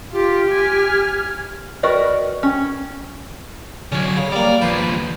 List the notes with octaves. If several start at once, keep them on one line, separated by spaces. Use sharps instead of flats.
F4 G4
G#5 F6
F#4 A#4 B4 D5 D#5
C#4
D3 F#3 C#4
C#3
G3 A#3 D5
D#2 F3 B4